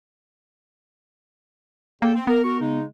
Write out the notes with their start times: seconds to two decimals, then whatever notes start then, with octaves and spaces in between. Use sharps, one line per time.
2.02 E2 A#3 A4 G5
2.15 C4
2.27 B3 A#4
2.44 F#4 A#4 C#6
2.60 C#3 G#3 D#4